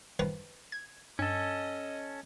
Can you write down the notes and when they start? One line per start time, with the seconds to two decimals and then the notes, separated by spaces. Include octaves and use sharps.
0.19 D#3 F3 B4
0.72 G#6
1.19 G2 C#4 A4 D#5